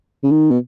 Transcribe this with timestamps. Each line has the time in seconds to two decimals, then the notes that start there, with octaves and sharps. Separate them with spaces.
0.24 C#3
0.31 D#3
0.51 B2